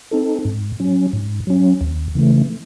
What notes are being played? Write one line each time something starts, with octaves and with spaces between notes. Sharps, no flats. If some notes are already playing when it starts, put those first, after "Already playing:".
C4 D#4 A4
G#2
F#3 C#4
G#2
F#3 C#4
D#2
C#3 E3 A3